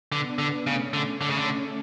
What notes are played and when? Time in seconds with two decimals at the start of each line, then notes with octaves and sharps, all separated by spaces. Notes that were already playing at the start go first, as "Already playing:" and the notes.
0.11 D3 B3 D4
0.39 D3
0.67 C#3 A3 C#4
0.94 D3
1.21 D3
1.29 C#3
1.37 D3